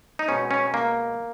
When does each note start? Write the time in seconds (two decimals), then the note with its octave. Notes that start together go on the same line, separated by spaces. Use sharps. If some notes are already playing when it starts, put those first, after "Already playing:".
0.19 D#4
0.28 B2 G#3 C#4
0.51 C#4
0.74 A#3